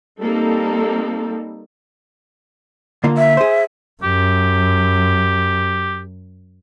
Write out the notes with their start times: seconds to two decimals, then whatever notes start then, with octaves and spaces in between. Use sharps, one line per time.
0.21 G3 A#3 C4 D#4 A4
3.04 D3 A#3 F4
3.18 E5
3.37 G#4 C5
4.03 F#2 G4